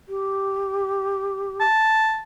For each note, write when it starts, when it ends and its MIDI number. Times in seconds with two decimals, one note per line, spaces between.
0.08 1.64 67
1.61 2.22 81